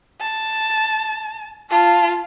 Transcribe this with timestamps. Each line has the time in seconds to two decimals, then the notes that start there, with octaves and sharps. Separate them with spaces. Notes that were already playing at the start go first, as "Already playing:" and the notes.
0.20 A5
1.71 F4 A5